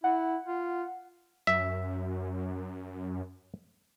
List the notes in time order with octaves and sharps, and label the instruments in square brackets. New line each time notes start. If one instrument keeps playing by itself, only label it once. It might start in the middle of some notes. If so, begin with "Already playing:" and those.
[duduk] E4 [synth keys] F#5
[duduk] F4
[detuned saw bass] F#2 [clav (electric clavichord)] E5